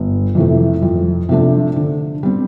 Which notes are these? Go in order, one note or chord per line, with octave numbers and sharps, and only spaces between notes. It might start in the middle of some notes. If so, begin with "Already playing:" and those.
Already playing: G1
F2 C3 E3 A3
F2
C3 F3 A3 D4
D3
G3 C4